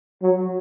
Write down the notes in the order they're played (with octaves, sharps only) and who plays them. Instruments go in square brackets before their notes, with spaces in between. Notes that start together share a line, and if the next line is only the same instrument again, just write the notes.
[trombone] F#3